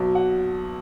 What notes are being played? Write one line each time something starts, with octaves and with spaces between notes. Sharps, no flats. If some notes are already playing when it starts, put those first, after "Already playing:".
Already playing: B1 B2 F#3
F#5